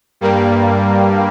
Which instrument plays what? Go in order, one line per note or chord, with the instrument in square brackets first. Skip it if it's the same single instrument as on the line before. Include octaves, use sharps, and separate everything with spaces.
[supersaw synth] G2 G3 A#3